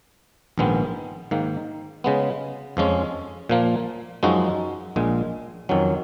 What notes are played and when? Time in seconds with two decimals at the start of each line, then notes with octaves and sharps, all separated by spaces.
0.58 A#1 G#2 D#3 G#3 B3
1.31 G#2 D#3 A#3
2.04 C#3 G#3 B3
2.77 F2 F3 G#3 C#4
3.49 A#2 F3 A#3
4.23 F#2 F3 G#3 D#4 F#4
4.96 A#1 A#2 G#3
5.69 F2 D#3 F#3 C#4